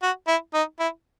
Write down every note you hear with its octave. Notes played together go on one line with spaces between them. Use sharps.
F#4
E4
D#4
E4